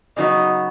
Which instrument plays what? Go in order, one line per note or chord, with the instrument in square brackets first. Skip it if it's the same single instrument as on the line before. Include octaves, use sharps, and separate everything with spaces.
[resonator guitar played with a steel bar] C#3 F#3 B3 [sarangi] D#4